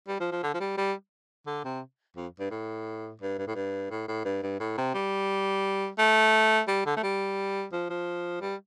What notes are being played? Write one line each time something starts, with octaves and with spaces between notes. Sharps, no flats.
G3
F3
F3
D3
F3
G3
G3
D3
C3
F2
G2
A2
G2
G2
A2
G2
A2
A2
G2
G2
A2
C3
G3
A3
G3
D3
A3
G3
F3
F3
G3